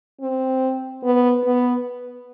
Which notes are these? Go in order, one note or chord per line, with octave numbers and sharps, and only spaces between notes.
C4
B3
B3